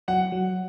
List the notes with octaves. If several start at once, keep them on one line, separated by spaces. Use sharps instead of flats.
F#3 F#5
F#3